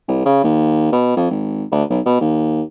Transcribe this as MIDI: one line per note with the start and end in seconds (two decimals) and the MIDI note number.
0.08 0.20 36
0.25 0.40 49
0.43 0.90 39
0.92 1.13 47
1.17 1.27 41
1.30 1.64 32
1.71 1.83 38
1.90 2.00 35
2.05 2.20 47
2.21 2.62 39